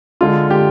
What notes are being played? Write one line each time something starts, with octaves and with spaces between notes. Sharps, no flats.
D3 G#3 F4
D3 G#3 G4